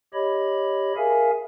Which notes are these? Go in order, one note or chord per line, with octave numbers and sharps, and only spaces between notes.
G4 C#5 D#5 B5
G#4 A#4 E5 F5 G#5